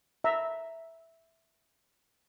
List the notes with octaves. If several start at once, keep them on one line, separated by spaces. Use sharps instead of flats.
E5 A#5